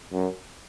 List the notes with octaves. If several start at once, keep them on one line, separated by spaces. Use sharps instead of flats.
F#2